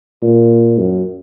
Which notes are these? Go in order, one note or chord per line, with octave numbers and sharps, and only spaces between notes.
A#2
F#2